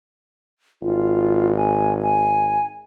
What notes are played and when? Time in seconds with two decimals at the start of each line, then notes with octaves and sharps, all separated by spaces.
0.82 G#1 F4
1.56 G#5
2.02 G#5